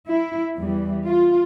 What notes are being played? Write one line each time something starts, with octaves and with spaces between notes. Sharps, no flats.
E4
E2 E3 G3
F4